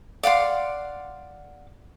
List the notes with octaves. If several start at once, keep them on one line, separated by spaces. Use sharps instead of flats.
D5 F5 F#5 C6